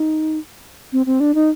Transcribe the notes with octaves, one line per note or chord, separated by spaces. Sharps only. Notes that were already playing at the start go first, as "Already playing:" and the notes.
Already playing: D#4
C4
C4
D4
D#4